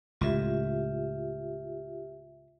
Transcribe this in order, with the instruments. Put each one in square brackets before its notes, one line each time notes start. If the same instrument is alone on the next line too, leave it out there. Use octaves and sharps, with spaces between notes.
[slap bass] C#2 A2 [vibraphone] F4 G4 E5